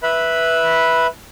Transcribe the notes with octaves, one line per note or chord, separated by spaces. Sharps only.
B4 E5 B5